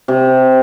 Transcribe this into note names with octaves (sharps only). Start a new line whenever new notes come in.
C3